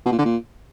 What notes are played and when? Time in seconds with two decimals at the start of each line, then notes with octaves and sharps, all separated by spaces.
0.06 B2
0.12 A#2
0.18 D3
0.25 A#2